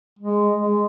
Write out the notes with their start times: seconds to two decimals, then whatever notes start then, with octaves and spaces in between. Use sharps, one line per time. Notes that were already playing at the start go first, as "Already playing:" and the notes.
0.19 G#3
0.58 G#3